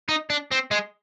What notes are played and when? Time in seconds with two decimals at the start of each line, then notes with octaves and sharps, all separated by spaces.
0.09 D#4
0.30 D4
0.51 C4
0.71 G#3